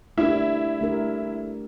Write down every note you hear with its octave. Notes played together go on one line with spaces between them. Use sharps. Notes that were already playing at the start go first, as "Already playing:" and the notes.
A3 D4 E4 G4 A#4
A3 D4 G4 A#4